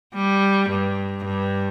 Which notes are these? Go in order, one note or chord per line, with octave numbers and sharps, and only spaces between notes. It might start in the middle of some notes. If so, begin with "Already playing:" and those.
G3
G2
G2